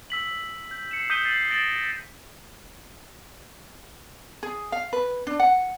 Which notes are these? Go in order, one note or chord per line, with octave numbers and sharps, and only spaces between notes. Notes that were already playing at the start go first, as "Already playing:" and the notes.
E6 B6 F#7
G6
C7 C#7 E7
D#6 G6 B6 D#7 G7
A6 C7 D#7 F#7
A6 A#6 D7 E7 F#7
G#4
F5
B4
D4
F#5